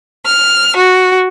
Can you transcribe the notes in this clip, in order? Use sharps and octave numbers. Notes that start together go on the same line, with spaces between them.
F6
F#4